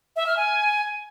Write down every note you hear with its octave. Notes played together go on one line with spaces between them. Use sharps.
E5
F6
G#5